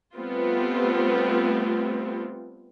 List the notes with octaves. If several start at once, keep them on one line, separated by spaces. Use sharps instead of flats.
G3 A3 B3 C4 F4